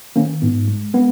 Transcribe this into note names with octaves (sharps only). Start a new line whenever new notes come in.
D#3 A#3 C#4
G#2 B3
G#3
G#3 B3